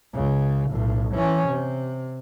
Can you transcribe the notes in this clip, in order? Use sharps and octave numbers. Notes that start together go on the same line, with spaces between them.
C#2 C#3
B1 A2
E3 C#4
C3